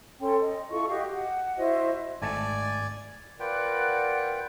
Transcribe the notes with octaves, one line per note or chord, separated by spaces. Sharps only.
C#4 A4 G5 C6
D#5
E4 F4 A4 C#6
F#4 G4 D#5 F5
F#5
E4 F#4 C5 D#5
G#1 A3 D5 G#5 A5
F4 A#4 B4 D5 F#5 G5